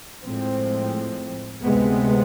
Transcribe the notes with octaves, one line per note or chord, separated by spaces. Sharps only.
A2 F3 G#3 C4
D2 C3 G#3 B3